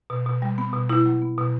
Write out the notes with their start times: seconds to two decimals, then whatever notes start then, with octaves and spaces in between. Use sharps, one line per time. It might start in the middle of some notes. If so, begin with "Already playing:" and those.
0.10 B2
0.26 B2
0.42 G3
0.58 B3
0.73 B2
0.89 B2 E4
1.06 F#3
1.22 B3
1.38 B2